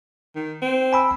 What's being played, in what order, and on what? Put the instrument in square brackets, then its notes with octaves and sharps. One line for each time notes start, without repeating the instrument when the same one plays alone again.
[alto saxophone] D#3
C4
[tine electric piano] G#5 B5 E6